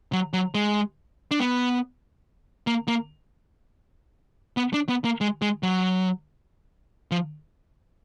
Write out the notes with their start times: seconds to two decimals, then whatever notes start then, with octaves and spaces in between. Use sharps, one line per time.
0.13 F#3
0.33 F#3
0.55 G#3
1.31 D4
1.39 B3
2.67 A#3
2.88 A#3
4.57 B3
4.74 D4
4.89 B3
5.05 A#3
5.21 G#3
5.42 G#3
5.63 F#3
7.11 F3